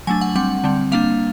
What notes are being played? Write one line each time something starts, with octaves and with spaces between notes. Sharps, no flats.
F#3 A3 D4 G#5
F#5
G3 C4 F#5
D3 G3 C4
G3 A#3 D4 F5